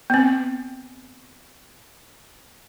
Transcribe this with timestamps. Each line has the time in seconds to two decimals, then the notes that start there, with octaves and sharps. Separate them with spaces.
0.10 B3 C4